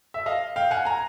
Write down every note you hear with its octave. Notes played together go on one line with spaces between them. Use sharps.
E5
D#5 F5
F5 G5
F#5 G#5
G#5 A#5